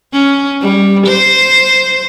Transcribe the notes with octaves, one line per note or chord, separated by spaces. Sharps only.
C#4
G3
C5